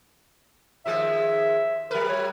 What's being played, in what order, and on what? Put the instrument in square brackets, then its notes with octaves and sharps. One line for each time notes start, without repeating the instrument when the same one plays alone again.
[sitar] D#2 F3 G#3 [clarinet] E5
[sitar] F#3 B4 [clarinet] A#4
[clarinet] C#5